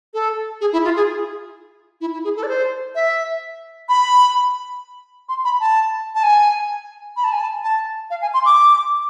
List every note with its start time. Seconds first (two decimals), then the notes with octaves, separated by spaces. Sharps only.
0.14 A4
0.61 G#4
0.73 E4
0.84 F4
0.96 G#4
2.01 E4
2.13 E4
2.24 G#4
2.36 A4
2.43 D5
2.48 C5
2.95 E5
3.89 B5
5.29 C6
5.45 B5
5.61 A5
6.15 A5
6.23 G#5
7.17 B5
7.24 A5
7.32 G#5
7.40 A5
7.63 A5
8.10 F5
8.22 G#5
8.34 C6
8.45 D6